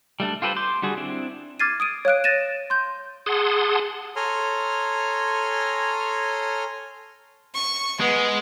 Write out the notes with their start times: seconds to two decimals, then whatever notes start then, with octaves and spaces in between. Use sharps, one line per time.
0.20 G3 A3 D4
0.42 F4 G4 A4 B4 C5
0.56 C6 D6 G6
0.82 D3 G3 F#4 G#4
0.97 C4 D4 E4
1.60 D6 F6 G#6 A6 C7 D#7
1.80 D#6 D7 D#7
2.05 C#5 F5 F#6 D7
2.24 A6 A#6 D#7 E7
2.70 C6 G6
3.26 G#4 F#5 A5 C6 D#6
4.16 A4 C#5 G#5 A#5 C6 F6
7.54 C#6
8.00 G#3 B3